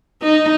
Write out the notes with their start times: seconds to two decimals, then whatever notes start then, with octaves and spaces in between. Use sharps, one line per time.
0.22 D#4